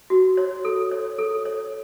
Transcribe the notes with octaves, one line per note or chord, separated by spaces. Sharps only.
F#4
C#5
A4
C#5
A4
C#5